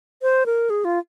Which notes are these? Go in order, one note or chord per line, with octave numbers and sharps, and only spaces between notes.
C5
A#4
G#4
F4